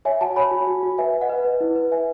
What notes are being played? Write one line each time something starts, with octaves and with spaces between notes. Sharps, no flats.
C#5 E5 G#5
F#4 F#5 A5
C#5 G#5 B5
F#4
F#4
F#4
B4 E5 G#5
B4
D#5 F#5
B4
B4
E4
B4
B4 E5 G#5